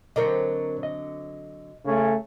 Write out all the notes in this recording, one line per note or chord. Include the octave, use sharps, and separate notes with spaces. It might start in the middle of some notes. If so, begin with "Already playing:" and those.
D3 F#3 C4 A#4 D5 D#5
D#5
C#3 A3 C#4